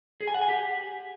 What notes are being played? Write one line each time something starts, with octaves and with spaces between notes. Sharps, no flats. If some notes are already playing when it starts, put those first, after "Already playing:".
G#4
G#5
F#5
G#5
G4